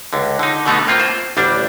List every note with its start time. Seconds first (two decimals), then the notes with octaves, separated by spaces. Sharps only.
0.13 C#2 D3
0.39 D3 D#4
0.66 B2 D3 A3 B3 D#4
0.87 A2 A#3 C4 F4
1.00 C5
1.37 A1 D2 G3 D4